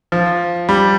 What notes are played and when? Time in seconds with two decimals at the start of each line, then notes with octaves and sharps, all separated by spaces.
0.12 F3
0.69 G3